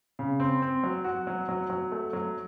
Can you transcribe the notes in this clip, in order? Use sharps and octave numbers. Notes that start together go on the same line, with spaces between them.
C#3
C4
C4
F#3
F#4
F#3
F#3
F#3
A3
F#3